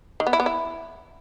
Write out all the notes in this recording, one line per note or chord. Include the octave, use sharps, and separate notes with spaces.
D#3
B3
E4
B3
E4